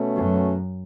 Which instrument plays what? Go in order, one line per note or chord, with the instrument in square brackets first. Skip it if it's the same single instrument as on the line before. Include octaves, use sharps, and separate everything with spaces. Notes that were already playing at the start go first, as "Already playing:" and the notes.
Already playing: [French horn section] B2 A3 C#4
[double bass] F#2